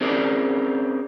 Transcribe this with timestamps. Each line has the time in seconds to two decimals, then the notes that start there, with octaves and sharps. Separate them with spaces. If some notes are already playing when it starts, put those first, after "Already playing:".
0.01 C4 C#4 G#4 A#4 D5